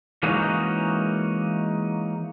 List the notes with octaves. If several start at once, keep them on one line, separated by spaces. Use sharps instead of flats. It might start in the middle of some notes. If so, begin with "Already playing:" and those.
E3 G#3 A#3 C#4 D#4 F#4